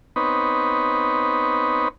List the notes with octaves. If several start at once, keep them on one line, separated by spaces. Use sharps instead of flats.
B3 C4 D#4 B4 C#5